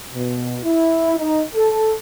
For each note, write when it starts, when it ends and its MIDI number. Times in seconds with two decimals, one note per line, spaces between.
0.13 0.58 47
0.65 1.16 64
1.19 1.42 63
1.55 1.94 69